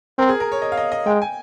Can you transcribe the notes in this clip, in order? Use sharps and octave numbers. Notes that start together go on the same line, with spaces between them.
C4 A#4
G#4
A#4
C#5
D#5
F5
D#5
D#5
G#3 G5
G#5